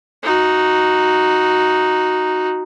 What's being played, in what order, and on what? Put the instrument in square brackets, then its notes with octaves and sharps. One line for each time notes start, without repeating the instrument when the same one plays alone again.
[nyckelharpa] D#4 F#4